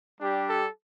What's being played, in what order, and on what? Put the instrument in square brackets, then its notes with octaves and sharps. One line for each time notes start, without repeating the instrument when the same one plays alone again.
[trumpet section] G3 D4 G4
A4